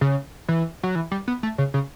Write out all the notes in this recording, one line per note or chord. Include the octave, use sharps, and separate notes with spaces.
C#3
E3
F#3
E3
G3
B3
A3
C#3
C#3